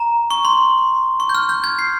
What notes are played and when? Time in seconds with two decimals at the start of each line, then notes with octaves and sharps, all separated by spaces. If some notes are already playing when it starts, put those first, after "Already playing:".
Already playing: A#5
0.31 C#6
0.45 C6
1.20 C#6
1.29 G6
1.35 F6
1.49 G6
1.64 G#6
1.79 C7